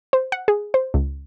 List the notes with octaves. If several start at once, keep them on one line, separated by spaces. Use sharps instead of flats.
C5
F#5
G#4
C5
C#2